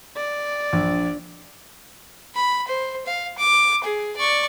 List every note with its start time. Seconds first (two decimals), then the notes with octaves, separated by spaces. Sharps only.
0.16 D5
0.73 A#1 D4
2.35 B5
2.67 C5
3.06 F5
3.37 D6
3.84 G#4
4.16 D5 C#6